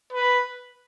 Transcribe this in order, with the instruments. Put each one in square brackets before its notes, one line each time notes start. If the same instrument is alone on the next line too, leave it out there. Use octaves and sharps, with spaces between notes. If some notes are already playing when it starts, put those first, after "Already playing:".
[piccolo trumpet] B4